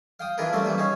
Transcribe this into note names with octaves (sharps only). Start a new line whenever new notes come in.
F5 G5 D#6
E3 D4 F4 G#4 A#4 B4
G3 A3 C4 C#4 C5 D5
E3 F#3 G3 A#3 B4
C#4 D#4 G#4 C#5